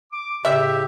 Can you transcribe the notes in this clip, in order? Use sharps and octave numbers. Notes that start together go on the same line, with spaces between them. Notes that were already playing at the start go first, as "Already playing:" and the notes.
D6
A2 C#3 G4 E5